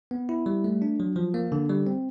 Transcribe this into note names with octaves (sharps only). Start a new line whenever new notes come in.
B3
E4
G3
A3
D4
F#3
F3
A#3
D3
G3
C4